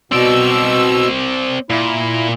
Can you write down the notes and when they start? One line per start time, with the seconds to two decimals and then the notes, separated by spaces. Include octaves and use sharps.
0.12 B2 C4 D5 E6
1.70 A#2 E4